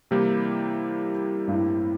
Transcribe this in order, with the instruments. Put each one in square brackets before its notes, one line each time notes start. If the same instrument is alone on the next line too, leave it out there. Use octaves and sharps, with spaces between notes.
[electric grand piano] C3 G3 A#3 E4 G4 [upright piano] E3
[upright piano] G2
A2